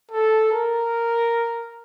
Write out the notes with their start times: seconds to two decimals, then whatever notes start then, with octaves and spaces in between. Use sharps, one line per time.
0.11 A4
0.52 A#4